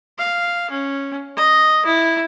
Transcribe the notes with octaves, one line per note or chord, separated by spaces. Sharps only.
F5
C#4
D#5
E4